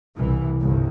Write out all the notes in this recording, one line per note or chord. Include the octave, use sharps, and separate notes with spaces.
C2 E3
G1 C2 G2